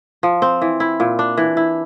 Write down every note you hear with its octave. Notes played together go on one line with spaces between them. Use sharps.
F3
C4
E3
E4
A#2
D4
E3
E4